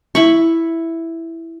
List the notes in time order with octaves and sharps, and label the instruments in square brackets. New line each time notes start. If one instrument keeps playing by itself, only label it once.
[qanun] E4 B5 C#6